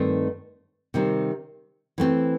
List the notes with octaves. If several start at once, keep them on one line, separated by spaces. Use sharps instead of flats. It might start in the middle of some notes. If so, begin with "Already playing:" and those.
Already playing: G2 D#3 A3 C4 D#4
C3 D#3 G3 C4
E3 A3 C4